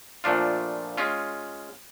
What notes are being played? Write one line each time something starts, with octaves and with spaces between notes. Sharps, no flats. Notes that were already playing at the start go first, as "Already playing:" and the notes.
A#2 F3 A3 D4 F4
G#3 C#4 F4